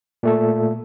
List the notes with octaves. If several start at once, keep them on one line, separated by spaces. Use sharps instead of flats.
A#2 A3 A4